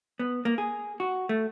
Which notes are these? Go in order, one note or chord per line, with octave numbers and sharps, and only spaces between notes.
B3
A#3
G#4
F#4
A3